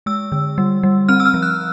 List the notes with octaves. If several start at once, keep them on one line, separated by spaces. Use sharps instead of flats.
G#3 E6
D3
G3
G3
C4 F6
E6
F6
F3
F#6